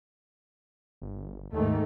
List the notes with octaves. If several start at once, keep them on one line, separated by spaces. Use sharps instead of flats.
G1
D#2 G#2 D#3 A3